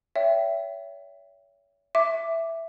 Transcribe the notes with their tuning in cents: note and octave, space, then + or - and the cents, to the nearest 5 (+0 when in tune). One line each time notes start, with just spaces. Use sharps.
C#5 +35 E5 +15 G5 +0
E5 +0 D6 +0